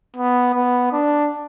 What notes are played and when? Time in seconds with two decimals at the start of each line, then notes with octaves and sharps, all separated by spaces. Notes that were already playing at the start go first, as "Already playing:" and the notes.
0.17 B3
0.54 B3
0.93 D4